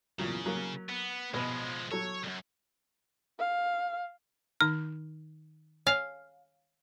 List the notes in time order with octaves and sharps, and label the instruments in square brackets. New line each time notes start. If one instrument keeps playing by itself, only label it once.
[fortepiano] E2 A#2 F#3 [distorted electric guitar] C#3
[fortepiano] F#3 A#3
[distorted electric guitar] B3
[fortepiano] B2 B3 [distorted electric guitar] F3 G#3
[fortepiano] F#3 A4 [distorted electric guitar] C#5
[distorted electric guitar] C2 F#2
[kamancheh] F5
[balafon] D#3 D#4 [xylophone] F6
[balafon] C#5 G#5 [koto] F5